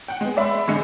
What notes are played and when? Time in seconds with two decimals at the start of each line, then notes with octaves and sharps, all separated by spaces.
0.08 F#5 G5
0.21 G#3 B3
0.37 D5 E5 B5 C6 E6
0.68 A1 D3 G#3 C#7